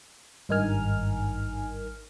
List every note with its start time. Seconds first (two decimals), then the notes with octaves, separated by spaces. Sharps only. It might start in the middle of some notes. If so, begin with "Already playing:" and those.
0.49 G#1 G2 D#4 A#4 G#5 F6